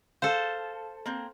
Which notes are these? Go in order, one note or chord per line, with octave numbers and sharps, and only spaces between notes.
A4 C5 F5
A#3 C4